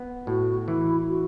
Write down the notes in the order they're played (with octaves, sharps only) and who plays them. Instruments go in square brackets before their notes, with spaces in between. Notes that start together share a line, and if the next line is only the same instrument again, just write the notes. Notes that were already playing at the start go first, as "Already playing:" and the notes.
Already playing: [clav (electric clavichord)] B3
[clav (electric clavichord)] A2 [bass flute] F#4
[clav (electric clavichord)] E3 [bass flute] E4
[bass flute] F#4